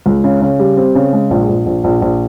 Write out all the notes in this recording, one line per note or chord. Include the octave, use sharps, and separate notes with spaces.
C#2
C#3
C#3
G3
C4
C#3
G#3
A#1
A#1
A#1
A#1
A#1